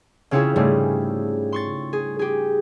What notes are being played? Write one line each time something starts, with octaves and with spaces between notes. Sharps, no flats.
C#3 C4 C#4 E4 F4 G#4
G#2 C#3 G3 A3 G#4
C6 C#6 A6
G#4
G4 G#4